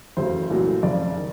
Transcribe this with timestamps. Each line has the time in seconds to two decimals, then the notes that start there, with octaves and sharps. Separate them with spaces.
0.17 F#1 E2 C#3 F#3 A3 C5
0.50 C2 A#2 F#3 A3
0.83 F#1 F2 C#3 D5
1.16 D#3